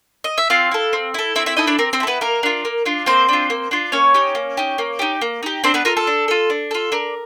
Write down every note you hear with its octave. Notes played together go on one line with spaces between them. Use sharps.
D#5
E5
C4 F4 F5
E4 A4
C4
E4 A4
C4 E4 E5
E4 E5
D#4 E4 A4 D#5
D4 D5
C4 A#4
C4 C5
E4 A4
B3 B4
A#3 A#4
D4 F4
A#3
D4 F4
A#3 C4 C5
D4 F4
A#3
D4 F4
A#3 C#4 C#5
D#4 G4
A#3
D#4 G4
A#3
D#4 G4
A#3
D#4 G4
C4 D4 C5
B3 B4
F4 A4 A#4
A4
D4
F4 A4
D4
F4 A4
D4 A#4